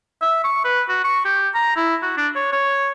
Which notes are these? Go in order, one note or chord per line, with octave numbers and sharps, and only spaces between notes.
E5
C#6
B4
F#4
C#6
G4
A#5
E4
F#4
D4
C#5
C#5